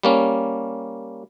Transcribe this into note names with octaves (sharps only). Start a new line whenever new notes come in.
G3 A#3 C#4